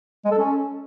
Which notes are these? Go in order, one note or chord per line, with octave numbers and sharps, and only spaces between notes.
G#3
A4
C#4